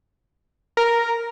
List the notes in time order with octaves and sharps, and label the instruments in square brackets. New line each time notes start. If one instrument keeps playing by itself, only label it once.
[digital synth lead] A#4